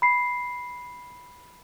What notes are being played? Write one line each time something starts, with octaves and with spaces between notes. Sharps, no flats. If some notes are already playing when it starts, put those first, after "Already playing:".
B5 C7